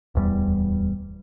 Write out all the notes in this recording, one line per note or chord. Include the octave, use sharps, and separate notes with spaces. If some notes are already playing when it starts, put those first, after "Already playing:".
D1 E2 G3